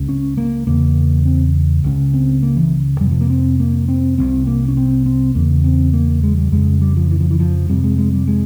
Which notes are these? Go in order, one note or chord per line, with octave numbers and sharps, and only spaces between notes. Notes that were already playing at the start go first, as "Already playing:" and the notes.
Already playing: C#2 C#3
C#4
A#3
E2 C#3 A#3
C4
C#2 C#3
C4
A#3
E3
F2 C3 G3
F3
A#3
C4
A#3
C4
C2 C3 C4
A#3
C#4
C4
C4
E2 C#3 A#3
C4
A#3
G#3
G3
F2 C#3 G#3
G3
F3
E3
F3
E3
F3
F2 C3 G3
G#3
G#3
G3
G#3